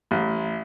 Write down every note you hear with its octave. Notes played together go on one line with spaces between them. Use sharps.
A1